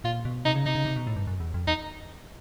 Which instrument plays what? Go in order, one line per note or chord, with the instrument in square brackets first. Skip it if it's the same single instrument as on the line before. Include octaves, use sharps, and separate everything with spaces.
[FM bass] A#2 [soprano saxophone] F4
[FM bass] B2
[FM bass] C3 [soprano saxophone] D#4
[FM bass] C#3
[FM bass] C3 [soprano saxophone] D#4
[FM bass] C#3
C3
B2
A2
G2
F#2
E2
F2
[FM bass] E2 [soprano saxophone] D#4